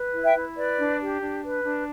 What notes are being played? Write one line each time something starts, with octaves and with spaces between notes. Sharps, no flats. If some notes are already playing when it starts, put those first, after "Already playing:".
Already playing: B4
E4
E5 G5
E4
B4 D5
D4
G4
D4
B4
D4